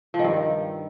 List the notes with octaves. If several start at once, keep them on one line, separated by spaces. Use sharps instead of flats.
F3
D#3
G2